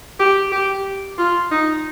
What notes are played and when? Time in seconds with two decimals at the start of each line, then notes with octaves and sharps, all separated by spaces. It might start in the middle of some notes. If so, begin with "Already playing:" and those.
0.19 G4
0.52 G4
1.18 F4
1.51 D#4